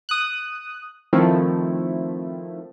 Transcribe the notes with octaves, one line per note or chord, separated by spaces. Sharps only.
D#6 F#6
D#3 F3 A3 C4 E4